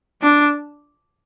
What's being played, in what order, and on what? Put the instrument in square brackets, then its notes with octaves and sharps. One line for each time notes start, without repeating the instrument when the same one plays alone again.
[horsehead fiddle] D4